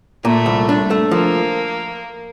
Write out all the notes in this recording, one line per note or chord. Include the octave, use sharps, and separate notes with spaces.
A#2 A3
C2
D4
A3
F3 A#3